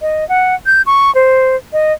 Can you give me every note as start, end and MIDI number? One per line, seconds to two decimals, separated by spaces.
0.01 0.27 75
0.29 0.55 78
0.66 0.82 91
0.86 1.13 85
1.15 1.56 72
1.73 1.93 75